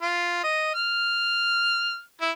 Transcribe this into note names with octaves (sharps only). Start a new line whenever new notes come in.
F4
D#5
F6
E4